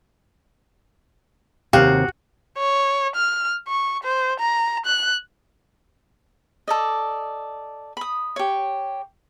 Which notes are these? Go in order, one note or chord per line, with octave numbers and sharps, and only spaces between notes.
D#2 C3 F#4 G4 F5
C#5
F6
C#6
C5
A#5
F#6
A4 D5 D#5
B5 D#6
G4 C#5